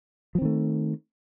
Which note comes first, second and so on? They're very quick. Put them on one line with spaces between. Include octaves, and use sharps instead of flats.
F3 C4 D#3 A3